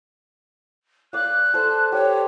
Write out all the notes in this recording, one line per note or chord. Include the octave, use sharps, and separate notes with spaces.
D5 F5 F#6
A4 C5
G4 C#5